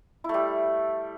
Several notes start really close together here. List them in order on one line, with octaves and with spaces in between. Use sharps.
E4 A3 G3